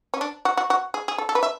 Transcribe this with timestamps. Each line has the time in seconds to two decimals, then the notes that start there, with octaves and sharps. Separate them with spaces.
0.14 C#4
0.21 D4
0.45 F#4
0.57 F#4
0.70 F#4
0.94 G#4
1.08 G#4
1.18 A4
1.29 A4
1.35 B4
1.43 E5